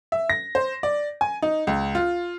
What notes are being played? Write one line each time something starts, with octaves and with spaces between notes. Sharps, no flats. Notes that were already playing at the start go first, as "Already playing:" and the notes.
E5
A#6
C5
D5
G#5
D#4
C#2
F4